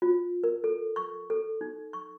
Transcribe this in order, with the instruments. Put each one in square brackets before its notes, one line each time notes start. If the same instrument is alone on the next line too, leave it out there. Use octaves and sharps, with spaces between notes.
[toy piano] F4
A#4
A4
C#6
A4
D#4
C#6